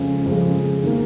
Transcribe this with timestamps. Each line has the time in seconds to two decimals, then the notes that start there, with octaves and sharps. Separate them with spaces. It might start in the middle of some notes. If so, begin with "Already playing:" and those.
Already playing: F2 C#3 G#3 C#4
0.25 F2 C#3 G#3
0.84 D#3 A#3